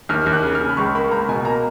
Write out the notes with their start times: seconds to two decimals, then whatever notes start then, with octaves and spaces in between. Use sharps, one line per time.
0.09 D#2 F6
0.26 D#2
0.33 F#6
0.44 C#3
0.55 F6
0.61 C#3
0.69 B5
0.77 C#2 C#6
0.95 A#3 B5
1.11 C#2 A#5
1.29 B2 G#5
1.45 A#3 A#5